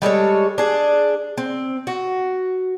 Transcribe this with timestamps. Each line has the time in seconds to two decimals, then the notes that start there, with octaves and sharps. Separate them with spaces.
0.02 G3 G#3 A4 C#5
0.58 D4 G#4
1.38 C4
1.87 F#4